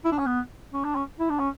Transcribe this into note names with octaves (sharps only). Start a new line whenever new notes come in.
E4
D4
C#4
B3
C#4
D4
C#4
E4
D4
C#4